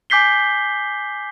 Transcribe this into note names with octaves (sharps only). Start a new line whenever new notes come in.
G#5 D6 G6 B6 C7 G7